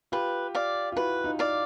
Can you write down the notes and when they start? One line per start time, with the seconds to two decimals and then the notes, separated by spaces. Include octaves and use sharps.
0.12 F4 G4 B4
0.55 D5 F5
0.92 F4
0.96 E4 F#4 B4
1.24 D#4 F4
1.39 D5 F5